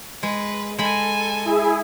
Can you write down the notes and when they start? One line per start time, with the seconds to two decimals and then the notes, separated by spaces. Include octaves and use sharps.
0.23 G#3 B4
0.79 G#3 A4 G#5 B5
1.45 E4 G#4